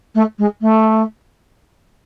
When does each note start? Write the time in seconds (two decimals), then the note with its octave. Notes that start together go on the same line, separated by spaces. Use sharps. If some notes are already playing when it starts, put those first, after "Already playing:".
0.14 A3
0.38 G#3
0.61 A3